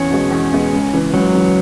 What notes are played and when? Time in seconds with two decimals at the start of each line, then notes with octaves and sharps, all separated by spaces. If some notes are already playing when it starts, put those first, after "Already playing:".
Already playing: E2 C#4
0.11 B2 G#3
0.31 E2
0.52 B2 G#3
0.73 C#2
0.93 C#3 E3
1.14 C#2 F#3
1.34 C#3 E3